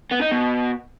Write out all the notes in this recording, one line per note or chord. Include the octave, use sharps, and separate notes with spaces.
B3
D#4
B2